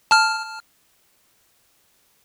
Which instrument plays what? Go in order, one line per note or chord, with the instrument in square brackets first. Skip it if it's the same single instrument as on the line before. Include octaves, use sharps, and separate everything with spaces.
[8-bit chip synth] A5 F6